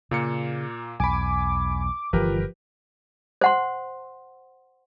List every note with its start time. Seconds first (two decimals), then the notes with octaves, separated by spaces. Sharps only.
0.11 A#2 C#3 A#3 C#7
1.00 B1 E2 G#5 B5 D6
2.13 G1 E3 F3 G3 G4 A#4 B4
3.41 C5 F#5 C6